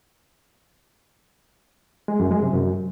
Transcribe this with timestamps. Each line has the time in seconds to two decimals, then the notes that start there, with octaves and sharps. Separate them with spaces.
2.08 G#3
2.20 F#2
2.31 G#3
2.42 C3
2.54 F#2